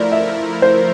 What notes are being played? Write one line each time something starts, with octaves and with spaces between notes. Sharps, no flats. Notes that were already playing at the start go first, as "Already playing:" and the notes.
Already playing: F3 A3 E4 A#4 D5
E5
C5